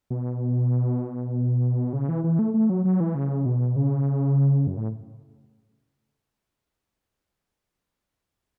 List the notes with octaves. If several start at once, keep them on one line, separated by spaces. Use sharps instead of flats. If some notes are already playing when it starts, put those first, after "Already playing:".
B2
C#3
E3
E3
A3
A3
F#3
F#3
E3
C#3
B2
C#3
F#2
A2